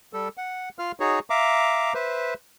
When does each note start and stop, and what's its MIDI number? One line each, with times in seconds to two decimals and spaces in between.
0.13 0.28 55
0.13 0.28 69
0.37 0.69 78
0.79 0.92 65
0.79 0.92 77
0.79 0.92 89
1.00 1.19 63
1.00 1.19 66
1.00 1.19 68
1.00 1.19 73
1.30 1.94 76
1.30 1.94 77
1.30 1.94 82
1.30 1.94 86
1.94 2.34 71
1.94 2.34 72
1.94 2.34 76